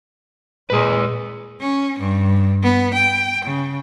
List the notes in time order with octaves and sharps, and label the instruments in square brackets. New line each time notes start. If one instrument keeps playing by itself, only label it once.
[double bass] A#2 G#3 [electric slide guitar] G#4 B4
[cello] C#4
G2
B3
G5
C#3